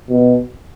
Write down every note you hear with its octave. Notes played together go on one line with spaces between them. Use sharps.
B2